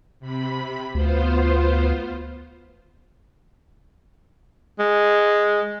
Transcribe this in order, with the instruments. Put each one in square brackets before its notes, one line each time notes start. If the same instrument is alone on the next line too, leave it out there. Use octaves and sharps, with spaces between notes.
[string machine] C3 B5
[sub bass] D2 [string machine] B3 F4 C5
[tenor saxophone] G#3